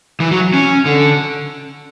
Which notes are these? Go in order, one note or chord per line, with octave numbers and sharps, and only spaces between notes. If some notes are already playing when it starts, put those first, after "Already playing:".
E3
F#3
C#4
D3